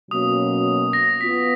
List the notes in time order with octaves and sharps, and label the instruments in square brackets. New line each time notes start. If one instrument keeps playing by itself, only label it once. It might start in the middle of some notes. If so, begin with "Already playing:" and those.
[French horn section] B2 F#3 A#3 C#4 F#4 [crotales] D#6
[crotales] A#6
[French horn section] B3 F4 [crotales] B6